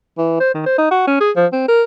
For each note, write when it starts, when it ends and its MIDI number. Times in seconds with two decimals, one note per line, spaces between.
0.18 0.39 52
0.40 0.50 72
0.54 0.64 51
0.66 0.78 72
0.78 0.86 63
0.91 1.04 66
1.07 1.15 61
1.20 1.31 68
1.36 1.46 53
1.53 1.64 60
1.68 1.83 70